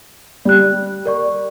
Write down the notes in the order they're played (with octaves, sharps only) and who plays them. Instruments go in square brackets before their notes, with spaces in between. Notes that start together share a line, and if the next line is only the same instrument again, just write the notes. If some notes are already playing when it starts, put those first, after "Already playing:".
[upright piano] G3 [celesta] D5 F#6
[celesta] A#4 D5 C#6